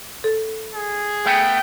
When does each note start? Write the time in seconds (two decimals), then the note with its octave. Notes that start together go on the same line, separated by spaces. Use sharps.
0.24 A4
0.74 G#4
1.26 A3 B3 G5